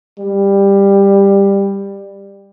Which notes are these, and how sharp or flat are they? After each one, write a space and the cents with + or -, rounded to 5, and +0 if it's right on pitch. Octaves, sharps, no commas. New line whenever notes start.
G3 +15